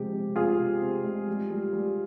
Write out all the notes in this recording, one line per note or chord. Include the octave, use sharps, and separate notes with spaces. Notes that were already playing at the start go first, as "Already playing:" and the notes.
Already playing: C3 F3 G#3 G4
C3
C3 F4 G#4
C3
C3
G#3
G3
G3
G3